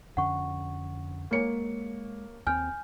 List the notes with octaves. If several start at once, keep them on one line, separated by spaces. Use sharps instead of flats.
F2 D3 C#4 F#5 C#6
G#3 A#3 C#5 C#7
D#2 C4 G#5 F6 G6